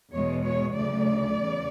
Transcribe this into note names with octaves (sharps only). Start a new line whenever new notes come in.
E2 B2 G#3 C#5
C#5
D2 C#3 F#3 A3 D5
E2 C#3